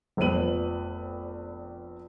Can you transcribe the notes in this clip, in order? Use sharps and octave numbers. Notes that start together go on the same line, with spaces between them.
F1 A#1 B3 B4 D#7 F#7